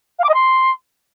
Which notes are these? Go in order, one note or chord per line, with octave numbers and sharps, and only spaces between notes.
F5
D6
D#5
C6